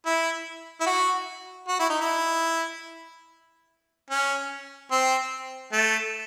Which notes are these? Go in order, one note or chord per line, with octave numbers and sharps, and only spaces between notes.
E4
E4
F#4
F#4
E4
D#4
E4
C#4
C4
A3